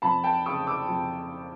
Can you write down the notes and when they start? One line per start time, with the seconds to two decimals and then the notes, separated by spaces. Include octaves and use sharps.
0.02 F2 A5 B5
0.24 G5 A5
0.46 C#3 C#6 D#6
0.67 D6 E6
0.88 F2